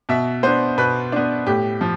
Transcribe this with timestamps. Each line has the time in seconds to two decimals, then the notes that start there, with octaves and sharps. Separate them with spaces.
0.09 B2 E5
0.43 B3 D4 C5
0.78 B2 B4
1.12 B3 D4
1.46 A2 G4
1.81 F3